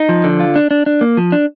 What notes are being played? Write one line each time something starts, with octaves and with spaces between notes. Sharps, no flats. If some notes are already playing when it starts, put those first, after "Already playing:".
Already playing: D#4
F3
D3
F4
D4
D4
D4
A#3
F3
D4